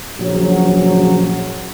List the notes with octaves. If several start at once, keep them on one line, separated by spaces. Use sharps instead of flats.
A#1 C#3 F#3